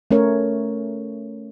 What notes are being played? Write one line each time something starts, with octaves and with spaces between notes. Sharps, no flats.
A3 C#4 A#4 C#5